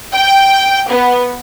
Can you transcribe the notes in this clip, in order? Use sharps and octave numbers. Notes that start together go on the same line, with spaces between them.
G5
B3